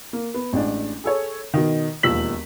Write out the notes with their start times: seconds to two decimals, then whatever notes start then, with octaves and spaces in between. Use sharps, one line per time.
0.13 A#3
0.34 B3
0.53 A1 G#3 D4
1.04 G#4 A4 C#5
1.54 B2 D#3
2.03 E1 D#2 F3 E6 B6 F#7